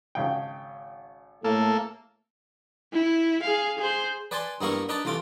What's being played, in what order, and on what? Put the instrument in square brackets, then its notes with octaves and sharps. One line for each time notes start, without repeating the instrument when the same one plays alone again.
[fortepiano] G#1 C#3 G5
[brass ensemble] A2 A3 [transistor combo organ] A#3 A4
[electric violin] E4
G#4 F5
G#4 C5
[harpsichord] B4 D5 G#5 A5 C6
G2 A#3 B3 E4 A#4 C#6
D4 D#4 B4 D5 A5
C2 E3 A3 F4 D6